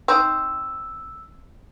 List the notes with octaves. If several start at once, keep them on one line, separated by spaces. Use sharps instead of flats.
C4 D#4 E6